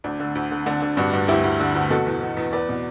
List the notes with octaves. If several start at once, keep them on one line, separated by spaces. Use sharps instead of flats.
D2 D4
D3
D2
D3
D3 D4
D3
G2 D4 F#4
G2
D2 E4 G4
D2
D3
D2
B2 F#4 A4
E2
E2
E2
E2 B4 D5
B2